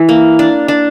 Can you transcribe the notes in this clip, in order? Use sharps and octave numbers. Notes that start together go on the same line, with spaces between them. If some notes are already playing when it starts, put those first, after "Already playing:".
Already playing: E3
A#3
D4
D4